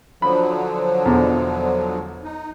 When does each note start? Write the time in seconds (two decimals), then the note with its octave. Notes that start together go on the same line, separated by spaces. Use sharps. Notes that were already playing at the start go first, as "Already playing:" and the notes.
0.22 D3 F3 F#3 B5
1.05 E2 B2
2.24 D#4